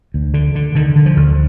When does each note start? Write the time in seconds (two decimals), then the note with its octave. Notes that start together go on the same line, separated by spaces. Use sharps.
0.14 D2
0.34 D3
0.55 D3
0.75 D3 D#3
0.96 D3
1.06 F3
1.17 D2